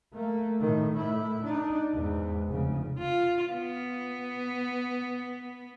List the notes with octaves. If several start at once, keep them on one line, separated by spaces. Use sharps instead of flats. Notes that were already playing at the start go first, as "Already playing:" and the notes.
A3 A#3
A2 D#3
A2 E4
D4 D#4
E2 G#2
F1 C#3
F4
B3